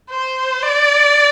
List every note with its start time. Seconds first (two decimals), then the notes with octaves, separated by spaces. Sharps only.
0.10 C5
0.63 D5